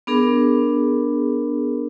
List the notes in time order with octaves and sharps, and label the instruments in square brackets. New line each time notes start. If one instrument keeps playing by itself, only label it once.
[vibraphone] B3 D4 G#4 A#4